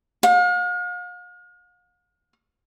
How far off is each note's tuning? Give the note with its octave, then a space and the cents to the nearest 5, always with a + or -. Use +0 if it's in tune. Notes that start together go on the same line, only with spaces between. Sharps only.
F5 +45